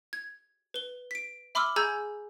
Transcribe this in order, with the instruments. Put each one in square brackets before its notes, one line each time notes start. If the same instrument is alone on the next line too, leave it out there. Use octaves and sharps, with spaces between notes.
[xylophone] G#6
B4 G7
B6 D7
E5 B5 C6 D6 E6 F6
G#4 G#5 A#5 E6 G6 G#6